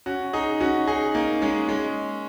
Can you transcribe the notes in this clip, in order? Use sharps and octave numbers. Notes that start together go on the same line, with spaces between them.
C#4 F#4
D#4 G#4
C#4 F#4
D#4 G#4
A#3 D#4
G#3 C#4
G#3 C#4